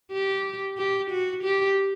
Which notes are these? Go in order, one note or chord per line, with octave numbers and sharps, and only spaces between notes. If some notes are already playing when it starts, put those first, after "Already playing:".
G4
G4
F#4
G4